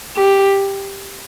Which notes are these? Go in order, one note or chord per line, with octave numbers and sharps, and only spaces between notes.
G4